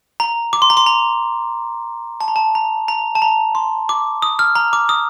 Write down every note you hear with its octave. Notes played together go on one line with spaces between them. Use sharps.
A#5
D6
C6
A#5
C6
A#5
A5
A#5
A5
A#5
A#5
A5
A#5
C6
D6
D#6
F6
A#5
D6
D#6